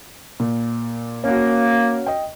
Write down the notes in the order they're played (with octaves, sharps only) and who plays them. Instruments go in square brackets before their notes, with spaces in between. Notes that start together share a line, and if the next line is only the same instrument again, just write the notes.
[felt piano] A#2
[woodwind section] A#3 [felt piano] C#4 F#4
[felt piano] D#5 G5